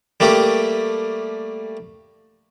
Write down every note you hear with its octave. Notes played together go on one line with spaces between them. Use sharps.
G3 A3 A#3 G4